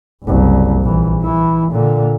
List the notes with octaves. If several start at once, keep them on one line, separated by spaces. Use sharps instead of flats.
F#1 C2
A#1 E3
E3 E4
A#2 D3